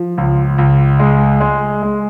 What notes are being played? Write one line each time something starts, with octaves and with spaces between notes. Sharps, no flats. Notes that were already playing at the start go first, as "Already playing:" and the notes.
Already playing: F3
C#2
C#2
G#3
G#3
G#3